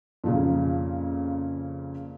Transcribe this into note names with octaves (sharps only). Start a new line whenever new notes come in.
F2 A#2 C#3